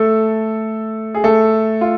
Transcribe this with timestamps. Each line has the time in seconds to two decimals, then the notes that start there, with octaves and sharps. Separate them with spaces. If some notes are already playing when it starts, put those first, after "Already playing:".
Already playing: A3 A4
1.15 G#4
1.24 A3 A4
1.81 F4